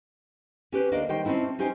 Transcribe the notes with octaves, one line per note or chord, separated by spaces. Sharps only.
C#4 G4 B4 C5
D2 A#3 D4 D#5
D#3 G3 C5 G5
C4 C#4 D#4 E4 A5
C3
C#4 D#4 G4 C5 G#5